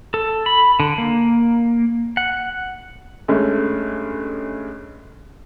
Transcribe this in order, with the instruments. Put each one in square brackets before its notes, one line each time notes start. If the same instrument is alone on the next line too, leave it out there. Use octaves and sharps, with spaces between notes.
[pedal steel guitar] A4
B5
D3
A#3
F#5
[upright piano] G2 G#3 A3 C#4